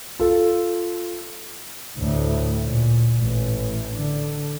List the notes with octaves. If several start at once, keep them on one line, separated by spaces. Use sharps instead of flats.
F4 A4
D2 A2
A#2
A1
D3